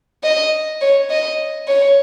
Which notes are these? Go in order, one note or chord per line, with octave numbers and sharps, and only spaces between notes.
D#5
C#5
D#5
C#5